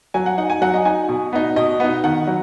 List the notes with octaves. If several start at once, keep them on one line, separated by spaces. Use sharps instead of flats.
F#3 G#5
F#5
D#4 F#5
G#5
F#3 F#5
D#5
D#4 G#5
B2
B3 D#4
B2 D#5
B3 D#4
D#3 F#5
F#3